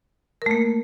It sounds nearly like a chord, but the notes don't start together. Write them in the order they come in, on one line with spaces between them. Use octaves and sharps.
A#4 A3 A#3